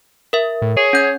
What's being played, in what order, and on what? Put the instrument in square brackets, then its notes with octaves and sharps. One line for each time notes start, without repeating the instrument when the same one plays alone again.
[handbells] A#4 E5
[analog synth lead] A2
[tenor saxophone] G#4 [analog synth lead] C#5
[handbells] C#4 G6 G#6 [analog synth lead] C#5